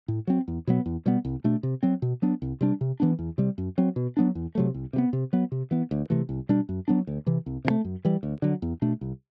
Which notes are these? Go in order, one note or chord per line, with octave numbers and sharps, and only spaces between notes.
A2
F#3 C4
E2
B2 F#3 B3
E2
B2 G3 B3
C2
B2 A3 D4
C3
F#3 C4
B2
F#3 B3 D4
C2
C3 G3 D4
C3
E3 B3 D4
E2
C3 G3
F#2
F#3 C4
B2
F#3 B3 D4
E2
C3 F#3 A3
C2
C3 F#3 B3
C3
F#3 B3
C3
E3 B3
D2
C3 E3 A3
C2
B2 G3 D4
F#2
F#3 B3 D4
D2
C3 E3
C2
C3 E3
A3
F#2
E3 G3
D2
D3 F#3
E2
B2 A3 D4
C2